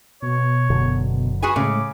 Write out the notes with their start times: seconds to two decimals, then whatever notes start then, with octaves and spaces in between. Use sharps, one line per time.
0.22 B2 C#5
0.70 F#1 F#2 B2 D3
1.42 F#4 G#4 B4 G#5
1.56 A2 C#3 G#3 D6